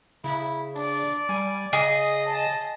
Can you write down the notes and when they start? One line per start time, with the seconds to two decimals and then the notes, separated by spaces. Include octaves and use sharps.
0.24 C#3 E4 B5
0.75 D4 D5
1.29 G3 G#5
1.73 C#3 G#4 D#5
2.25 A5